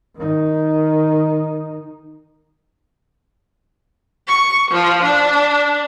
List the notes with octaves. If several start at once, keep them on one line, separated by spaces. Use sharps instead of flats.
D#3 D#4
C#6
F3
D4